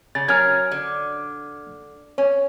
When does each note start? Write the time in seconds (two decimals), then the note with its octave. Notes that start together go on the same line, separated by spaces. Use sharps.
0.15 C#3 A6
0.28 F#3 C#4 A#4 F6 G#6
0.72 D3
2.18 C#4 C#5